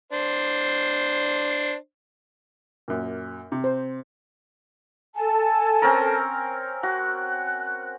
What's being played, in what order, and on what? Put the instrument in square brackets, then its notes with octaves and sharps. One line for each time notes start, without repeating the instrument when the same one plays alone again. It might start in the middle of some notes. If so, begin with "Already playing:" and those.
[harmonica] D4 C5
[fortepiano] F#2 A#2
C3
[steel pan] C5
[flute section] A4 G#5 A5
[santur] C4 C#4 A#4
[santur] F#4 [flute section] F#6